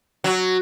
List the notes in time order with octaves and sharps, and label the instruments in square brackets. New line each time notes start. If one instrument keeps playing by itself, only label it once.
[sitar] F#3